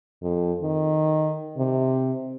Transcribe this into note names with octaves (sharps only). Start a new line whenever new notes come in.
F2
D#3
C3